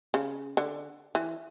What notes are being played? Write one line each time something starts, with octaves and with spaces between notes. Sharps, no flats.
C#3
D3
E3